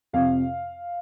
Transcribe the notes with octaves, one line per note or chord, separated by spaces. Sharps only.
F2 C3 F5